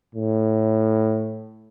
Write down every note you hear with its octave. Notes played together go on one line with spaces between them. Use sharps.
A2